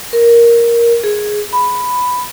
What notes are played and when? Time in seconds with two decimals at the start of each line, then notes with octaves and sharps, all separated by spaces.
0.13 A#4
1.04 G#4
1.53 B5